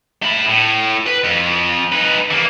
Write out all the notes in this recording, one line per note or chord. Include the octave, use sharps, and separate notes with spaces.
A3 B5
A2
B4
F2
D#4 B4
E3 A#3